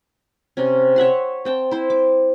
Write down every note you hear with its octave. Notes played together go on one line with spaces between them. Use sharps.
C3 C#4
C#5 E5 F#5 C6
C4 G5 A5
E4 C5
D6